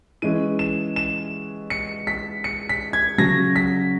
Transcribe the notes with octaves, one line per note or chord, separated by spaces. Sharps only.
E3 G#3 C#4 D#7
E7
E7
C#7
B6
C#7
B6
G#6
C#3 F#3 C#4 A#6
B6